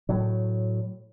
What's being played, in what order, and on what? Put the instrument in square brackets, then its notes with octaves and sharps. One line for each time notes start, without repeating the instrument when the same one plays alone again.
[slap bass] A2 F#3